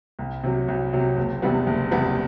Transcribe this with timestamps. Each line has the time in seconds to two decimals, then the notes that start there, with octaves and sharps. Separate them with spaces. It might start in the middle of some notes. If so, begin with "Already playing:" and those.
0.19 C2
0.44 C3 F#3
0.68 C2
0.93 C3 F#3
1.17 F#1
1.42 E2 C3 G3 B3
1.67 F#1
1.91 E2 C3 G3 B3